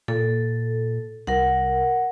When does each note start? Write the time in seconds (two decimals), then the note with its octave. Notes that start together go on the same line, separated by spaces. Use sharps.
0.08 A#2 A4
1.27 C2 A#4 F#5